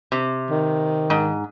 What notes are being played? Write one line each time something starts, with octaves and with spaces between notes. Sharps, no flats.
C3
D#3
G#2